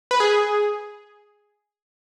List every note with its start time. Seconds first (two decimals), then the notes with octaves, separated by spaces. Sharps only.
0.11 B4
0.20 G#4